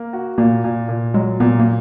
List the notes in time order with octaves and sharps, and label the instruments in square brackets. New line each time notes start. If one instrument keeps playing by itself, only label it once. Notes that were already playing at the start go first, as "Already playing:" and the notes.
Already playing: [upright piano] A#3
F#4
[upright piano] A#2 [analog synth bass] A#3
[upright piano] A#2
A#2
[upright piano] F#3 [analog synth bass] G#3
[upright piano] A#2 [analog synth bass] B3
[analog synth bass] A#3